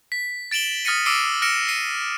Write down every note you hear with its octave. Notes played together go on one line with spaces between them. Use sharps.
B6
A6 D7 E7 F#7 G7
D#6 F6 A6 A#6 C#7 D#7
D6 E6 C7 D7 D#7 G7
F6 A#6 C#7 D7 E7
C7 D#7